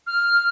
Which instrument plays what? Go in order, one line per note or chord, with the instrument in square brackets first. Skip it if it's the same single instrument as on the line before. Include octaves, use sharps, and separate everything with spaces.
[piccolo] F6